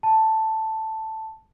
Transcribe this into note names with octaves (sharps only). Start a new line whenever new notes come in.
A5